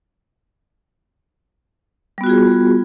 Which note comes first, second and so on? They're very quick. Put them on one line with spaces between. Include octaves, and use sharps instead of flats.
G3 B3 F#4 F4 G#4